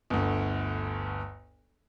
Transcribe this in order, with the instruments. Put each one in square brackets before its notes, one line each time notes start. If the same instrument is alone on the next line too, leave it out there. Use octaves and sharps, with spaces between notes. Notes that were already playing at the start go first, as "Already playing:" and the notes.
[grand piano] G1 D2